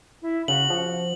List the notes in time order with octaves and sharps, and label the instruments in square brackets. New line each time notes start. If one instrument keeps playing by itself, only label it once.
[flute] E4
[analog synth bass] C#3 [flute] F#4 [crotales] F#7
[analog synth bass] F3